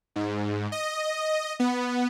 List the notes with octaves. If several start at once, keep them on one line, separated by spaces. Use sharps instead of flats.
G#2
D#5
B3